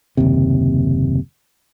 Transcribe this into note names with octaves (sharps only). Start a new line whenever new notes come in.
F#1 D#2 C3